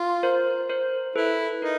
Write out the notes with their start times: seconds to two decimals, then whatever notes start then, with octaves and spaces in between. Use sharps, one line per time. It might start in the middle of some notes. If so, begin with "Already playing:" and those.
Already playing: F4
0.23 A#4 C5
0.69 A#4 C5
1.16 E4 A4 B4
1.62 D#4 A#4